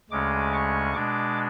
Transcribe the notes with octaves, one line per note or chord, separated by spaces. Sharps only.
D2 C#3 G#3 C#4 D6
C#6
B2 G#3 D4 D6